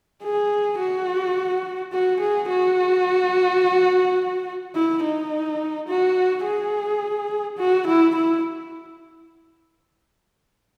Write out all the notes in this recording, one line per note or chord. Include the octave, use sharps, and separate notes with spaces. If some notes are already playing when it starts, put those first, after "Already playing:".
G#4
F#4
F#4
G#4
F#4
E4
D#4
F#4
G#4
F#4
E4
E4